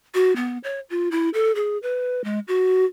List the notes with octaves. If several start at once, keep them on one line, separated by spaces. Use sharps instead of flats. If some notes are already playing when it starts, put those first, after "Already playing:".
F#4
B3
C#5
F4
E4
A4
G#4
B4
G#3
F#4